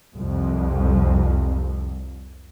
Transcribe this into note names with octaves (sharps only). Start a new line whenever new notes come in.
C2 F2